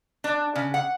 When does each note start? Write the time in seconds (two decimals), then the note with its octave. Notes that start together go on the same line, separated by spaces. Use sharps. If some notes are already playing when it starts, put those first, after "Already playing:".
0.24 D4
0.55 C#3
0.74 F#5